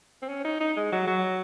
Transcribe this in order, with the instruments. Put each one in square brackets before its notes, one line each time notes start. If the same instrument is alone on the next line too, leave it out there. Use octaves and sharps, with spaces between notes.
[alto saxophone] C4
C#4
D#4
D#4
G#3
F#3
F#3